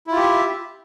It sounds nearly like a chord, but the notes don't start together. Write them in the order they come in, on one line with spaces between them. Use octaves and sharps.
E4 F4 G4 E5